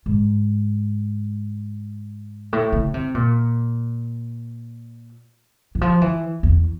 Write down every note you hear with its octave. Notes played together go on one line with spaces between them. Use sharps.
G#2
A2
C#3
C3
A#2
E3
F3
E3
E2